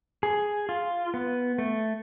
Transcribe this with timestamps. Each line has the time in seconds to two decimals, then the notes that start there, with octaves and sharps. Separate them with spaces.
0.23 G#4
0.69 F4
1.14 B3
1.58 A3